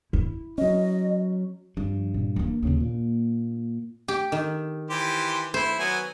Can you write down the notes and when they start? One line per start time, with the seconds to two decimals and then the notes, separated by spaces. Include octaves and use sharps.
0.13 E4
0.58 F#3 C#4 D#5
1.77 G2 F3
2.14 A#2
2.36 E3 A#3
2.63 D#2 C#3 A#3 D4
2.80 A#2
4.08 G4
4.32 D#3
4.90 E3 G4 C5
5.54 E4 C5
5.79 F#3 B3 G#5